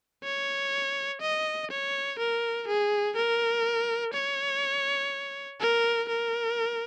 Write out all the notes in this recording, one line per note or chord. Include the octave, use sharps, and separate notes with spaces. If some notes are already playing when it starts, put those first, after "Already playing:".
C#5
D#5
C#5
A#4
G#4
A#4
C#5
A#4
A#4